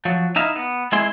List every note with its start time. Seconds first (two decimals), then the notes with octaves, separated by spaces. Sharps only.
0.05 F3 F#3
0.36 D#4 E4 E5 F5
0.56 B3
0.92 G#3 C4 E4 G#4 C6